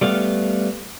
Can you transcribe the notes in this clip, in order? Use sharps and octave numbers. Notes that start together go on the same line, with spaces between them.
G3 A3 B3 F5